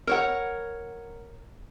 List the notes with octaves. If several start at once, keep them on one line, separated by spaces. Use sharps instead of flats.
A#4 C#5 F#5